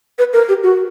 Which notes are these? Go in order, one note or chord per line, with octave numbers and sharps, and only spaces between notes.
B4
A#4
G4
F#4